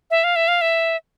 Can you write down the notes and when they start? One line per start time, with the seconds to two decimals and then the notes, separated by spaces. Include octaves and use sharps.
0.11 E5
0.24 F5
0.36 E5
0.48 F5
0.61 E5